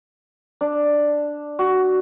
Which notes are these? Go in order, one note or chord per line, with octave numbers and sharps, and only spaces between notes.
D4
F#4